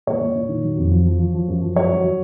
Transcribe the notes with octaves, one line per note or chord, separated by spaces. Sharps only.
A#2 C#5
A#2
A#2
D#3
F#3
F2
F3
F3
F3
F3
F#2
F3
F#3 C#5
F#3
F#3